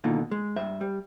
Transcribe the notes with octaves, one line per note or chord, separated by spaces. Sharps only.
B2 D3 D#3 A#3 D#4 F4
G#3
G2 C5 E5
G3